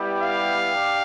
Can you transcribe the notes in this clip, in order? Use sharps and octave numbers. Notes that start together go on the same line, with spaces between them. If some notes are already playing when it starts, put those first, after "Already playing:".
Already playing: G3 B3 E4 G4
F5
D4 G4